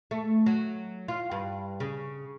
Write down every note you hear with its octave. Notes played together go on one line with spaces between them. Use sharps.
A3
F#3
F4
G2
C#3